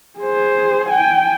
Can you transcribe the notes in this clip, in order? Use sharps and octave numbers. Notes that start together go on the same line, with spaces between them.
G#4 C5
G5 G#5